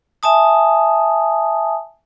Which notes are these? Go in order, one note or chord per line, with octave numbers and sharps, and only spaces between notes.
E5 G#5 A5 D#6